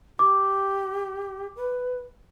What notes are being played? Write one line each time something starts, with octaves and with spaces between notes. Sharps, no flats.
G4 D6
B4